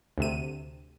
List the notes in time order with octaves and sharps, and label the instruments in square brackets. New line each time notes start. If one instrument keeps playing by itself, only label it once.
[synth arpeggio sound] D2 C3 D#7